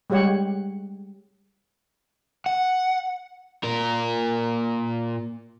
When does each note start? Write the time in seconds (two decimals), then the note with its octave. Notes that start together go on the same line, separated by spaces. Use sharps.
0.10 G3 G#3 G4 C#5 F#5
2.46 F#5
3.64 A#2 A#4